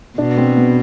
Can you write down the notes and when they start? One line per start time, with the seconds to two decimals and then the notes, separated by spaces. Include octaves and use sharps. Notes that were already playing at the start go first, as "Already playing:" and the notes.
0.18 B2 D4
0.37 C4
0.57 B3